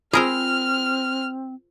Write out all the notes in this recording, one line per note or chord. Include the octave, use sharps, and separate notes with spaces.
C4 F4 G#4 A#4 C5 E6 F6